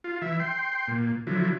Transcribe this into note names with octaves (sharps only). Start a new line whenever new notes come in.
F4
E3 E5
G5 C6
A#2
D3 F3 F#3 E4